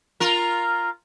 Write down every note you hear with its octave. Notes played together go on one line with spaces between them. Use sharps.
F4 A#4